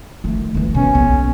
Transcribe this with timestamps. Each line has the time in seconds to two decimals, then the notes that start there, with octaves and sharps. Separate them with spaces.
0.24 D#3 A3
0.54 D#3 E3
0.75 B2 C#4
0.95 B1